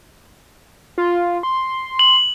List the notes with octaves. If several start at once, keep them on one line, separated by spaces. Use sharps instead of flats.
F4
C6
F#7